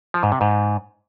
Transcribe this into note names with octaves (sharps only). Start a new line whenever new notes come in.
F3
G#2
C3
G#2